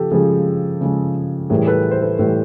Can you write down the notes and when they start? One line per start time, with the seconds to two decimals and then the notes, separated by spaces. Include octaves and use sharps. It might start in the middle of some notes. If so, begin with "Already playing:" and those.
Already playing: C#3 F3 G4 A4
0.12 C#3 F3 G#3 G#4
0.81 C#3 F3 G#3
1.49 A2 E3 G3 G#4 A#4
1.67 A4 B4
1.91 C5
2.02 A4 B4
2.19 A2 E3 G3 A4 B4